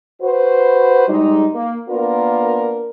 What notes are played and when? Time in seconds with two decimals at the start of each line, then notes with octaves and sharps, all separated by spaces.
0.22 F#4 B4 C5
1.08 G#2 G3 G#3 D#4
1.54 A#3
1.89 A#3 B3 D4 F4 A#4